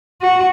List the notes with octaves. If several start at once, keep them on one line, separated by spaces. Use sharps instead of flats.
F#4